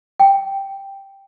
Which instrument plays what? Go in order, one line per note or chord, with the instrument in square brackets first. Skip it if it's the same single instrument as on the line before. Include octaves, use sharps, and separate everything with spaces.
[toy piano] G5